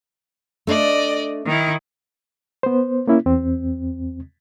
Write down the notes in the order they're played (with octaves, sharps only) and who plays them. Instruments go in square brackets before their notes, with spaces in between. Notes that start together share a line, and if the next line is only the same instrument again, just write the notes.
[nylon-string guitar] A3 D4 [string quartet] D5 D#5
[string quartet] D#3 E4
[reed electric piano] B3 C5
A#3 C#4 E4
E2 C4